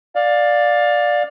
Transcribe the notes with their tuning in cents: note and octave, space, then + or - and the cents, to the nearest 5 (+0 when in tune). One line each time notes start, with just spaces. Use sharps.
D5 +5 F5 +20